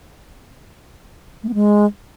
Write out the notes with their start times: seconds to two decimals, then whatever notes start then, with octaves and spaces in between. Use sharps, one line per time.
1.43 A3
1.49 B3
1.54 G#3